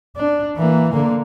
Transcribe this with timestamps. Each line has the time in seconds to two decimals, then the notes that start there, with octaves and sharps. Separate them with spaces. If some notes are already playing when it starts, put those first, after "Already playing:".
0.17 D4
0.57 E3 A#3
0.90 D3 A#3